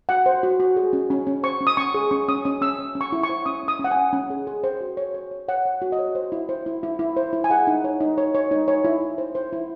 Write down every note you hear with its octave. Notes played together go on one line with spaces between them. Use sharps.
F#4 F#5
C5
F#4
F#4
G#4
C#4
C#4
C#4
C5 C#6
C#4
D#6
C#4 C#6
G#4
C#4 C#6
C#4 D#6
C#4 D#6
C#4 E6
C#4
C#4
C#6
E4
C#6
C5
C#4 D#6
C#4
D#6
C#4
F#5
C#4 G#5
C#4
G#4
G#4
C5
F#4
C#5
C#5
C#5
C#5 F#5
C#5
F#4
D#5
C#5
C5
E4
C5
E4
E4
E4
C5
E4
G#5
G#4 F#5
D#4
C#5
D#4
C#5
C#5
D#4
C#5
E4
E4
C5
C5
E4